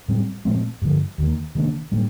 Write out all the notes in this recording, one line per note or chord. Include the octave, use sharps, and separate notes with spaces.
A2 G3 C4
A#2 F3 A3 C4
G2 D3 F3
D#2 D#3 A#3
C3 D#3 A#3 D4
A2 G3 A#3 D4